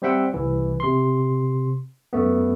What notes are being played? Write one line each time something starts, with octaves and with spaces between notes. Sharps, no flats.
G3 C4 C5 E5 F#5 G5
C2 E3
C3 C6
F#2 A3 B3